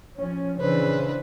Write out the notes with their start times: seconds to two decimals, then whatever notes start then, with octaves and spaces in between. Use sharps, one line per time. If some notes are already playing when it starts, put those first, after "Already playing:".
0.20 F3 C#4
0.59 C#3 E3 D4 B4 C5